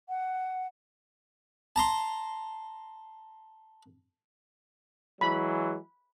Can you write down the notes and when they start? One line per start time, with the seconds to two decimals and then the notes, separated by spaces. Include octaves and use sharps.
0.08 F#5
1.76 A5 A#5 C6
5.21 E3 F#3 G#3 B5